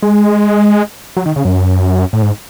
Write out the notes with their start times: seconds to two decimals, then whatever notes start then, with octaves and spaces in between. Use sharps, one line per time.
0.03 G#3
1.17 F#3
1.26 D#3
1.36 C#3
1.45 F#2
2.13 A2
2.22 G#2